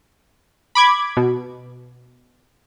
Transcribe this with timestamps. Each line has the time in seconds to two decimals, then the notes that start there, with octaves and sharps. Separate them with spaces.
0.75 B5 D6 G#6
1.17 B2